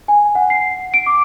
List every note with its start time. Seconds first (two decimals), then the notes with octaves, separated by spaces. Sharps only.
0.08 G#5
0.35 F#5
0.50 C7
0.94 D7
1.06 D6